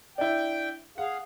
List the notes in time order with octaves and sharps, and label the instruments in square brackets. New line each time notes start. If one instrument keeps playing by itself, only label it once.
[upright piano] D4 E4 [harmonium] G5
[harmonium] G#4 F5 [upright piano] F#5